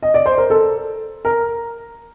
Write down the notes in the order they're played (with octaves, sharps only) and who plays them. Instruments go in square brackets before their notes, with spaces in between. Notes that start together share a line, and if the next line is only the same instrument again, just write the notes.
[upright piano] D#5
D5
C5
A#4
A4
A#4